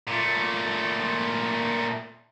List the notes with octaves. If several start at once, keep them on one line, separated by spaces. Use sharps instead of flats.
A#2 A3